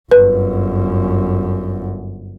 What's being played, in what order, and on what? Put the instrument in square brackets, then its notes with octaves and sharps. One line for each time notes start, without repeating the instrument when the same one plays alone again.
[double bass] G1 F#2 [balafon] B4